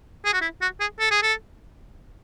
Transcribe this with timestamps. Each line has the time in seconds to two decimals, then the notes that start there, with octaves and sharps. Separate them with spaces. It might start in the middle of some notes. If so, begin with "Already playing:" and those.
0.25 G#4
0.33 F#4
0.42 E4
0.62 F#4
0.80 G#4
1.00 A4
1.11 G#4
1.23 A4